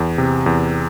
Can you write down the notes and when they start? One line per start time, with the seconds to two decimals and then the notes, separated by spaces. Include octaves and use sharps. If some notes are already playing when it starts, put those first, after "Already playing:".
Already playing: E2
0.18 C3
0.46 E2